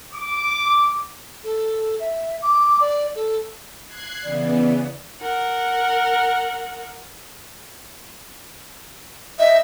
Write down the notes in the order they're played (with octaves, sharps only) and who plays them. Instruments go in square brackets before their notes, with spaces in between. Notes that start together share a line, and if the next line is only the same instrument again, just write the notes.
[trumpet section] D6
[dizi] A4
E5
D6
D5
A4
[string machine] F#6 G#6 C7
[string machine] C#3 E3 B3 [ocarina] D5
[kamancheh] A#4 F#5
[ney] D#5 [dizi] E5